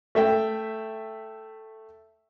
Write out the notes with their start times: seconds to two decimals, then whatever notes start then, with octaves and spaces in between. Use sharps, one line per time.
0.15 A3 E5 G5